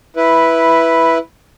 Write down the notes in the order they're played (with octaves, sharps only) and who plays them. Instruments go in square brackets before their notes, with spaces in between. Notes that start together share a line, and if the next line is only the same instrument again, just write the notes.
[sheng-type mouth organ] E4 B4